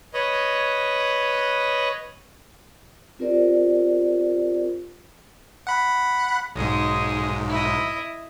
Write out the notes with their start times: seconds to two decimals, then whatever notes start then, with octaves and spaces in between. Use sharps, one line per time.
0.14 B4 C#5 D#5
3.19 C4 F4 G4 A#4 C5 D5
5.67 F#5 B5
6.56 B1 G#2 G#3 D#5
7.49 E4 D#5